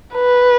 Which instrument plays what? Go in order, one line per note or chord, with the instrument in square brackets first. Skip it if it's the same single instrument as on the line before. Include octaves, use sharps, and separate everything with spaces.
[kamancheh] B4